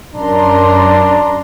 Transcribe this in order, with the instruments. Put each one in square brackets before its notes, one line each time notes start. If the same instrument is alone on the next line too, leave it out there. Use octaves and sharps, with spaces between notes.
[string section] F#2 A#5 C6 [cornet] D4